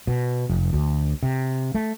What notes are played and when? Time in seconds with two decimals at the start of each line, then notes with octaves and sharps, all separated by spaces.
0.07 B2
0.49 F1
0.73 D2
1.23 C3
1.75 A3